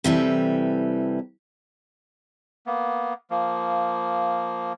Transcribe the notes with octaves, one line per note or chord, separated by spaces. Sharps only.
C3 E3 G3 A4
A#3 B3
F3 A#3